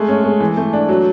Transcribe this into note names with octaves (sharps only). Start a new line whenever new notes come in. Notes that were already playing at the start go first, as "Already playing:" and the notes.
Already playing: G#3 A3
C#4
G#3
E3
A3
D4
F#3